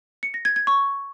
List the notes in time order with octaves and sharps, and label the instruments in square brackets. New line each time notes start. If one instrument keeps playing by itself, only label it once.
[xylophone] C#7
A#6
G#6
G#6
C#6